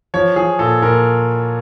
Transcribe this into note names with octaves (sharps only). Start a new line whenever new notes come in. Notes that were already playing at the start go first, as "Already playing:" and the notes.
F3 C#5
F3 G#4
A#2 A4
A#2 A#4